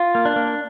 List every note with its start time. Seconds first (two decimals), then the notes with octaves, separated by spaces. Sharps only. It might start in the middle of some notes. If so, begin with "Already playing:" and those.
Already playing: F4
0.15 A#3
0.25 D4
0.36 A#3